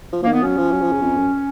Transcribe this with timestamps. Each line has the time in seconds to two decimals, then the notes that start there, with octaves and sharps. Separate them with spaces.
0.12 F3
0.23 F3 A#3
0.28 D#3 B3
0.42 F#3 C#4
0.57 F3
0.72 F#3
0.81 F3
0.92 C#3
1.02 F2
1.17 F#2